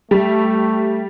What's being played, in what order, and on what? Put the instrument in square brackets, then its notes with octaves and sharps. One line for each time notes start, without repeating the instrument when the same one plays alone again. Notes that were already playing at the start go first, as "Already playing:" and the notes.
[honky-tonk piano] G3 [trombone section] A3